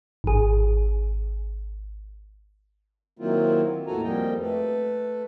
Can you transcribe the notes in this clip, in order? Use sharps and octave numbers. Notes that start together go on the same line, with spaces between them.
G#1 G#4
D#3 F#3 A#3 C4 E4 F4
D#2 A2 F#4 A4 G#5 A#5
F2 F3 G3 A#3 D#5 G5
A3 A4 B4